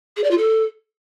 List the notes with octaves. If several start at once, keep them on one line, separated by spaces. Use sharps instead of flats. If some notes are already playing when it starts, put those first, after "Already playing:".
G#4
D5
F4
A4